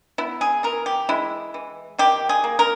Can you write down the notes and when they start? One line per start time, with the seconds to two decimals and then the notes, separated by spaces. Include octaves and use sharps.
0.18 B3 E4
0.41 G#4
0.63 E3 A#4
0.86 G4
1.09 G#3 E4
1.54 E3
1.99 D#3 G4
2.29 G#4
2.44 A#3
2.59 A#4